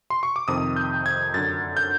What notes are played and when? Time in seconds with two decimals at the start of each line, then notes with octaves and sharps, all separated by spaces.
0.10 C6
0.23 C#6
0.36 D6
0.48 F2 C3 D#3 D#6
0.76 G6
1.06 G#6
1.34 F#2 D3 A6
1.77 G6